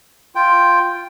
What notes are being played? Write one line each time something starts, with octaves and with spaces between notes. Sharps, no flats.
F4 G5